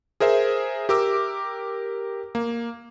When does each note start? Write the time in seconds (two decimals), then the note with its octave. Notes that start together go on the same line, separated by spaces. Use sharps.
0.20 G#4 A#4 C5 E5
0.89 G4 A#4 D6 E6
2.35 A#3